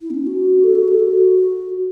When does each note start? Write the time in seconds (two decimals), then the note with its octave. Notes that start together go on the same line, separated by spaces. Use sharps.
0.02 E4
0.10 B3
0.14 C#4
0.27 F#4
0.64 A4
0.75 F#4
0.88 A4
0.99 F#4